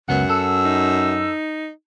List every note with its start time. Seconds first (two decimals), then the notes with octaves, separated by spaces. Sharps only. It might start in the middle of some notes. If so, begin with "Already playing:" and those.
0.09 C#2 F#2 B3 F#5
0.29 A4 E6
0.65 D#4